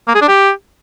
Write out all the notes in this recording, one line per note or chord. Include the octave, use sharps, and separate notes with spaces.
A#3
G#4
D4
G4